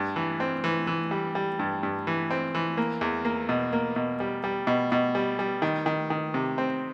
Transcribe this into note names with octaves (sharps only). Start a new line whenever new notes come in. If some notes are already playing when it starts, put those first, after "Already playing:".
Already playing: G2
E3
C4
E3
E3
G3
G3
G2
G2
E3
C4
E3
A#3
E2
A#3
B2
A#3
B2
G3
G3
B2
B2
G3
G3
D#3
D#3
D#3
C3
C4